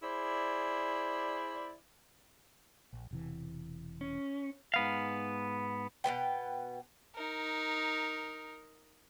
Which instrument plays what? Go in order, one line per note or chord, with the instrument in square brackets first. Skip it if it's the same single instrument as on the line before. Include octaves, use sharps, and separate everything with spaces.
[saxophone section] E4 G#4 C5 D5
[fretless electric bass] A#1
E1 C3 E3
[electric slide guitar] C#4
[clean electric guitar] G#2 B3 F5
[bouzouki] B2 B3 B4 G5
[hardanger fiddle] D#4 A#4